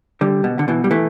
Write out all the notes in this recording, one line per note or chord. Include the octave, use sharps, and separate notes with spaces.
D3 G3
B2
D3
B2 E3
G3
E3 A3